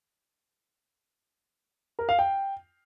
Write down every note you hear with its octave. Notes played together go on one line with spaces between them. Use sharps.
A#4
F5
G5